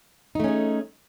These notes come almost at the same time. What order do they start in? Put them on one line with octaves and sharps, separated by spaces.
D#4 A3 C#4 G#4